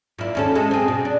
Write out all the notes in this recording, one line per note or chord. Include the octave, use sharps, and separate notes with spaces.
A#2 E4
D#2 C#4 A4
G#3 A4
C4 G#4
B2
D4